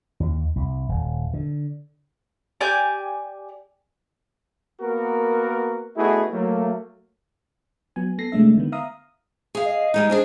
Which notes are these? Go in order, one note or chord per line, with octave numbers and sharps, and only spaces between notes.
D#2
C2
D#1
D3
G4 D5 G#5 G6
A#3 B3 F#4 A#4
A3 B3 D#4 E4 F#4 G#4
F#3 A3 A#3
F#3 B3 G#5
B3 A4 A#6 C7
C3 G#3 A3 D4 E5
D3 D#3 B3
E5 F5 A#5 D#6
G#4 F5
D#5
G3 G#3 D#4
C4 D4 G#4